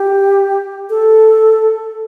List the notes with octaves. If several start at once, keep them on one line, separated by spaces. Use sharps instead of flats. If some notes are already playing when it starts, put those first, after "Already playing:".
Already playing: G4
A4